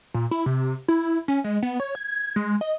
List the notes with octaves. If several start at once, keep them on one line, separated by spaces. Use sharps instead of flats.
A#2
E4
C3
E4
C#4
G#3
B3
C#5
G#6
G#3
D#5